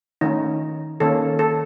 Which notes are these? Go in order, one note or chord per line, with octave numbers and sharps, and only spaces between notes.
D#3 A3 C#4 D#4
D#3 A#3 C#4 A4
A4